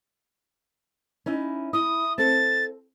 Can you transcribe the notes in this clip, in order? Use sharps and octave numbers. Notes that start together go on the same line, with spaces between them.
C#4 D#4 E4
E4 D#6
C4 A4 A6